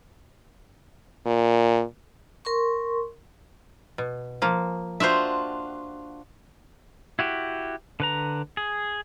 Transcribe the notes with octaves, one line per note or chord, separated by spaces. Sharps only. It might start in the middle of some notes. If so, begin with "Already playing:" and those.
A#2
A#4 C6 C#6
B2
F3 A#3
D4 F4 F#4 C5 E5
E4 F#4 G4
D3 B4 A#5
G#4